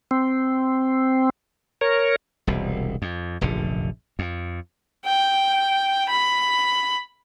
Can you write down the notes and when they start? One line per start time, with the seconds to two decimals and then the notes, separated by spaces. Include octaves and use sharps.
0.11 C4
1.81 A#4 C#5
2.47 E1 C2
3.02 F2
3.41 F1 A#1 F#2 D3
4.19 F2
5.05 G5
6.09 B5